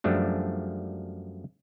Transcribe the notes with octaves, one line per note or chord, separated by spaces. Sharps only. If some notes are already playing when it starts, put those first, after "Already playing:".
F#2 F3 G3 A3 D4